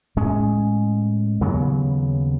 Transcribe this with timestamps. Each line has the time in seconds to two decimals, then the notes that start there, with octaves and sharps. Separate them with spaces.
0.16 A2 G#3 C#4
1.41 D#2 C#3 F#3 B3